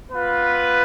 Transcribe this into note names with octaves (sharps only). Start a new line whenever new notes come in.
B3 F4 B4